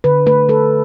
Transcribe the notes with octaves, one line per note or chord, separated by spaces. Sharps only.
D3 B4
A3 B4
A3 A4